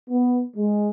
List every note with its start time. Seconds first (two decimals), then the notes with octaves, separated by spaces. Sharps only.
0.10 B3
0.57 G#3